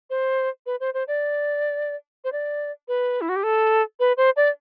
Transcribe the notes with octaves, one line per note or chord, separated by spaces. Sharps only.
C5
B4
C5
C5
D5
C5
D5
B4
E4
F#4
G4
A4
B4
C5
D5